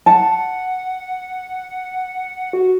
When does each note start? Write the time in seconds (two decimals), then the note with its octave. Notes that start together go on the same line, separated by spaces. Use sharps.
0.06 F#5 A5
2.53 F#4